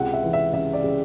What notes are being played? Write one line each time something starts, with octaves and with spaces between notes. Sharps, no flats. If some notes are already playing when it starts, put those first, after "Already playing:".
Already playing: C#2 C3 F#5
E5
E3
E5
C#3 E5
D5
C#3